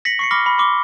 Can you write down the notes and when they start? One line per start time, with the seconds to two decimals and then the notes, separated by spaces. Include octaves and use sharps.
0.05 A#6 B6 C#7 F#7
0.19 C#6 C7 C#7
0.31 B5 D6 F6 A#6 G7
0.46 B5
0.58 C6 D6 G7